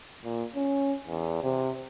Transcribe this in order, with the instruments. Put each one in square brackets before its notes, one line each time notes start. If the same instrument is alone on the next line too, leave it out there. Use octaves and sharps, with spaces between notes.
[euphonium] A#2
C#4
E2
C3